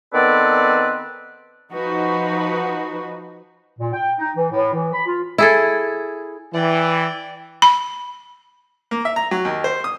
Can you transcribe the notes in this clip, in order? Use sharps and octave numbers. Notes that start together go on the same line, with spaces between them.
D#3 B3 C4 A4 B4 D5
F3 D#4 F#4 B4
A#2
G5
D#4
E3
A2
E3
B5
F4
E4 G#4 A4
E3 D5 G5
B5
A#3
E5
A#5
F#3
D#2
C5
D#6